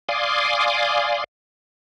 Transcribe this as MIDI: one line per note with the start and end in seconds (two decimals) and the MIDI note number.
0.09 1.24 74
0.09 1.24 77
0.09 1.24 80
0.09 1.24 84
0.09 1.24 86
0.09 1.24 87